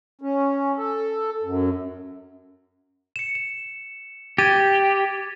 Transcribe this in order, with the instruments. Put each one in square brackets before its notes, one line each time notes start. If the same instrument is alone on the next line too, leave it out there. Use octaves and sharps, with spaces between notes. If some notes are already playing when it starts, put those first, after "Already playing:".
[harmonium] C#4
A4
F#2
[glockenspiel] C#7 E7
E7
[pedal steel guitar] G4 [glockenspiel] G#6 A6 D#7